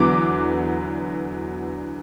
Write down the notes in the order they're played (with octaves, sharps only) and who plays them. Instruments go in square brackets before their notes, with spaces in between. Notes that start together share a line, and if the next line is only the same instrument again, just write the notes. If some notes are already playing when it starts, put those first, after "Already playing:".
Already playing: [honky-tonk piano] E2 D3 F#3 B3 D6